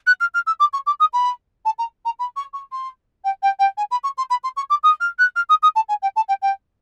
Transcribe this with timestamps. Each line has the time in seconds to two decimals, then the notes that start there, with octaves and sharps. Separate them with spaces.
0.06 F#6
0.20 F6
0.34 F6
0.46 E6
0.60 D6
0.73 C#6
0.86 D6
1.00 D#6
1.13 B5
1.65 A5
1.78 A#5
2.05 A#5
2.19 B5
2.36 C#6
2.53 C#6
2.72 C6
3.24 G5
3.42 G5
3.59 G5
3.77 G#5
3.91 B5
4.03 C#6
4.17 C6
4.30 B5
4.43 C6
4.56 C#6
4.70 D6
4.83 D#6
5.00 F6
5.18 F#6
5.35 F6
5.49 D#6
5.62 D#6
5.75 A5
5.88 G#5
6.02 G5
6.16 A5
6.28 G5
6.42 G5